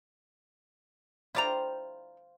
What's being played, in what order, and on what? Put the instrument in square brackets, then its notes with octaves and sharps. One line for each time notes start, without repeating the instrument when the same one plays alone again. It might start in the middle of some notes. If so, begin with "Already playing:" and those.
[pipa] E4 D5 A#5 [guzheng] F4 C5 G5